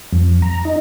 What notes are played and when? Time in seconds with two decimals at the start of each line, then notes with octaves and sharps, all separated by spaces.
0.12 F2
0.42 A#5
0.65 D#4